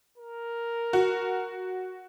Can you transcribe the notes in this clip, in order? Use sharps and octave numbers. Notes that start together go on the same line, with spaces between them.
A#4
F#4